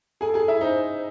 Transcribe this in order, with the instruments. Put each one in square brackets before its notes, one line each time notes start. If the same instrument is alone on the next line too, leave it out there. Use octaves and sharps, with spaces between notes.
[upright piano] G#4 G#5 [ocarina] A4
[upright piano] G#4 G#5
E4 E5
[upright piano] D#4 D#5 [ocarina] C5